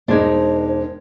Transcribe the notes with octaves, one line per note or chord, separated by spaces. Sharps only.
E1 G#3 D4 D#4 C5 G#6